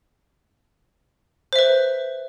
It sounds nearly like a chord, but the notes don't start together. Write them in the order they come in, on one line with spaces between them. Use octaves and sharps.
C5 E5 B4